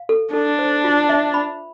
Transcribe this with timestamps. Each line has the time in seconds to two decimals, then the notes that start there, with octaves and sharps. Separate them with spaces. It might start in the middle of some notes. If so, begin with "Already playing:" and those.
Already playing: F5
0.09 A4
0.33 D4 A4
0.59 C5
0.84 F4
1.09 E5
1.34 B5